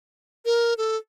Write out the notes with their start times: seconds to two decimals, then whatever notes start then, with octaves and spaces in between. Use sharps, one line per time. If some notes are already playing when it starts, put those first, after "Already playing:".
0.46 A#4
0.78 A4